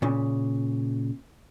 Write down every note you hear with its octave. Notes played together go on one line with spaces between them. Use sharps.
A#2 C#3